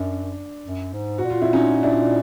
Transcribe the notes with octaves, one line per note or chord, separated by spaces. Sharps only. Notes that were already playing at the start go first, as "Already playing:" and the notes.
Already playing: F#2 D4
F#2
G#2
F#4
A#2
F4
E4
C#4 D#4
D4 E4